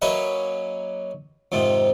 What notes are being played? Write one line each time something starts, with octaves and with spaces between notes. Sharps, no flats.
F#3 A#3 C#4 B4 D#5 E5
F2 G#2 C3 D#3